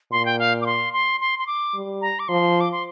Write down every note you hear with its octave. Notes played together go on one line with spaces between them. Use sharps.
A#2 C6
G5
F5
D6
C6
C6
C6
C6
D6
G3
A#5
D6
F3 C6
D6
C6